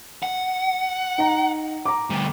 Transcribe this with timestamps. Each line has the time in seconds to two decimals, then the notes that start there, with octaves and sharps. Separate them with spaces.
0.23 F#5
1.18 D#4 A#5
1.86 A#5 D6
2.10 D2 G3